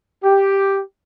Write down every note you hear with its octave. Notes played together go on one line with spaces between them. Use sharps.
G4